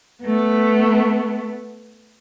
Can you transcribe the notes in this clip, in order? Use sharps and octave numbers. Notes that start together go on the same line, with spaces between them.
A3 B3